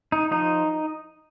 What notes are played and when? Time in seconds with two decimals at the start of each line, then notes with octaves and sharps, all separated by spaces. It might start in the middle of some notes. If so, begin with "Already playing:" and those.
0.12 D#4
0.31 F3 D#4